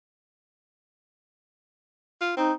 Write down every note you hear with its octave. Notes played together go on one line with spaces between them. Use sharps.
F4
C4 D#4